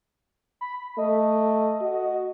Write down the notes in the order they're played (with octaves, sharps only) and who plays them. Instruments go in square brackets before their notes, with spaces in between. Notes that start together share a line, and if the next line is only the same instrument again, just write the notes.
[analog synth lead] B5
[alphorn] A3 [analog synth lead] D#5
[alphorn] F#4